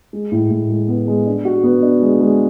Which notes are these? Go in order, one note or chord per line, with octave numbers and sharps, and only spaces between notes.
G#3
A2
A2
G#3
B3
G#3
D4
F#4
B3
D4
G#3
G#3